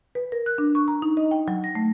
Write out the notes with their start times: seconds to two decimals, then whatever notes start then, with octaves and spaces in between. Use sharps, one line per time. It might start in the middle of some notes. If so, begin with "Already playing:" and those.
0.15 B4
0.32 A#4
0.46 F#6
0.58 D4
0.75 C#6
0.88 A#5
1.02 D#4
1.17 D#5
1.31 G5
1.48 F#3
1.64 A#6
1.75 A3